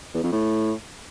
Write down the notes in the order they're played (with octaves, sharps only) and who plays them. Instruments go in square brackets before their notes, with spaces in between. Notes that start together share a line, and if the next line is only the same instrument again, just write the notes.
[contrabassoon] E2
F2
A2